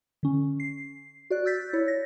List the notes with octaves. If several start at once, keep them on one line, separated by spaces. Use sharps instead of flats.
D3 C#4
C7
F#4 D5 F#6
E6 G6 A6 B6
E4 C#5
A#6